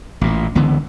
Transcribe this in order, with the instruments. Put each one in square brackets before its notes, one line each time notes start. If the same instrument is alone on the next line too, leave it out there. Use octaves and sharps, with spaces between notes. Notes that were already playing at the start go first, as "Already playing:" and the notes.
[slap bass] A1 A#2
C#2 D3 E3 B3